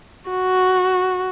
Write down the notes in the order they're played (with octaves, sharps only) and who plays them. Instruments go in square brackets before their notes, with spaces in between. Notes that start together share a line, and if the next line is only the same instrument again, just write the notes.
[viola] F#4